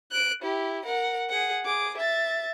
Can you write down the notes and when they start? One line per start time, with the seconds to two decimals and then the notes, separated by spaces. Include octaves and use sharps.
0.12 F#6 D7
0.42 E4 G4
0.85 A#4 F#5
1.29 G#4 F#5
1.65 G#4 D6
1.97 E5 A6